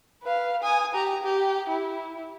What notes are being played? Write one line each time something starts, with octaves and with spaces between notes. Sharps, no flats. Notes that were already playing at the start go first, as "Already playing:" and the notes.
B4 F5
G#5 D#6
G4 A#5
G4
E4